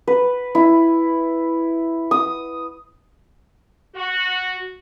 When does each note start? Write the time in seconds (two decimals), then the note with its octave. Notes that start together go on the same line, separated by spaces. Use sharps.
0.07 B4
0.55 E4
2.11 D#6
3.96 F#4